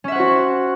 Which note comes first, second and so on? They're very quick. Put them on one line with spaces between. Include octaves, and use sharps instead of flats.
C#4 E5 F#5 C5 F#4